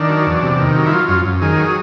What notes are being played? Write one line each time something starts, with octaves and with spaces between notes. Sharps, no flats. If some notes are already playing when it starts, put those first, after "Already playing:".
Already playing: D#3 D4
F#3
E2
C3
D#3
F#3
E4
F#3 F4
F#2 F4
F#2
D#3 G#4
F#3